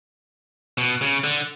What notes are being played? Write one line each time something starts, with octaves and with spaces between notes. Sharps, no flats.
B2
C#3
D3